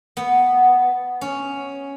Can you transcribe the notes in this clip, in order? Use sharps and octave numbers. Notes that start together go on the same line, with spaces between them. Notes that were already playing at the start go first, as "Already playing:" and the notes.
B3
C#4